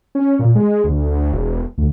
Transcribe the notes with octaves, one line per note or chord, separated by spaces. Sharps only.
C#4
A#2
G#3
D2
E1
D2